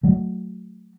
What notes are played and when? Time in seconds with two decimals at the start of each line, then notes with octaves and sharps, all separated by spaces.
0.03 F#3 A3